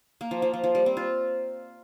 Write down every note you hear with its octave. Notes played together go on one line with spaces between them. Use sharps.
A#3
F3
F3
F3
F3
G3
C4
F4